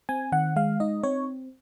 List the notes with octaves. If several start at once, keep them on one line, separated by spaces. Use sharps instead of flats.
C4 G#5
D#3 F#5
G#3 F5
D#4 D#5
C4 C#5